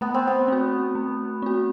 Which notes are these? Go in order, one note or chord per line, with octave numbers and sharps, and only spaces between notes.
A3 B3
C4
B3
C4 F#4
A3
C4 F#4